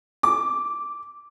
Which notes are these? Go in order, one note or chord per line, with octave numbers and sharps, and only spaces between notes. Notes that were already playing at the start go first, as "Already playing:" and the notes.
D6